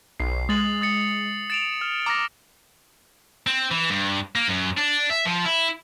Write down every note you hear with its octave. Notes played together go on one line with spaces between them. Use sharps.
B1 C7
G#3 D#6 A6 F#7
D#6 A6 C#7
A6 D7 E7 F7
F6
A#5 D6 F6 A#6
C4
E3
G2
A#3
F#2
D4
E5
F3
E4